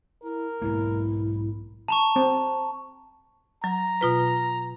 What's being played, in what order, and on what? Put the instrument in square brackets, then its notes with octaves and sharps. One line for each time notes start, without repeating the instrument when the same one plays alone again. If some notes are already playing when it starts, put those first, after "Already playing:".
[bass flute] E4 [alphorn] A#4
[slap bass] B1 G#2 A#3 [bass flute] E4
[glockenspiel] A5 A#5 C#6
[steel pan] C4
[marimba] F#3 [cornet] A#5
[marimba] B2 F4 B4